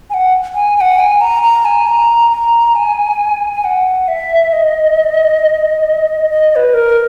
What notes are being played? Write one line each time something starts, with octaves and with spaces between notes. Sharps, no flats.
G#5
F#5
G#5
G#5
F#5
G#5
A#5
A#5
G#5
A#5
A#5
G#5
G#5
F#5
E5
D#5
D#5
D#5
B4
A#4